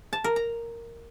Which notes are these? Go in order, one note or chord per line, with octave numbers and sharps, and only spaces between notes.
A5
A#4
A#5